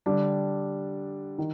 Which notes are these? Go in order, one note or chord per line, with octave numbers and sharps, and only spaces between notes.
D3 G3 D4
D#3